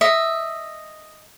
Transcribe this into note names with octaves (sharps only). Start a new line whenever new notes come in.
D#5 E5